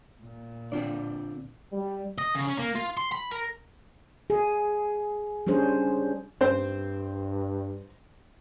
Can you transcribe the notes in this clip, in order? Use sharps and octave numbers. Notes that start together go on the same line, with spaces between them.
A#2
D3 C4 F4 D5
G3
D#5
C#3
C#4
A#3
F4
C6
B5
A#4
G#4
G3 C#4 D4 G#4 C5
G2 C4 C5